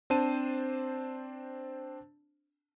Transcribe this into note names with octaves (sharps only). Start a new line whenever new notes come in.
C4 D4 C5 A5 D#7